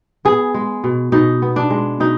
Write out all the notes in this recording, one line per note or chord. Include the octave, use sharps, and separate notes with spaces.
B3 G#4
G#3
B2
B2 D#4
B3
D4
G#3
B2 D#4